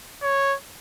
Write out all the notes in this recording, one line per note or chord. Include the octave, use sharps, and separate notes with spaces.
C#5